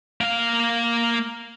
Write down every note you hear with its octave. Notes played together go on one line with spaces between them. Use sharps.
A#3 F5